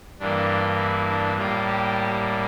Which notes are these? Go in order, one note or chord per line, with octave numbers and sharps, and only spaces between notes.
G2 E3 A#3 D4
E4
D4
A2 G3 A#3 F4
G4